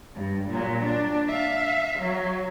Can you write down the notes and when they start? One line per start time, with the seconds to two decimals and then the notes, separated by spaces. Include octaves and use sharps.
0.14 G2
0.50 A#2 F#3
0.81 D4
1.27 E5 F5
1.99 F#3